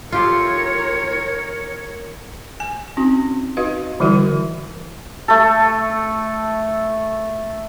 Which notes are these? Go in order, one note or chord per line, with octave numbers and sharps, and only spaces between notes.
F4 G4 A4 A#4 C#5
G#5
C4 C#4 D#4 F#4
D#4 F#4 B4 D#5 F5
D3 E3 G3 E4 F#4 A#4
A3 A4